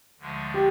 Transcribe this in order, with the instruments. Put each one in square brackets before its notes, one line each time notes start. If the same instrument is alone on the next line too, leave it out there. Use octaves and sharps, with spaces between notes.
[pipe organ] D2 D3 F3 G#3
[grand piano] G4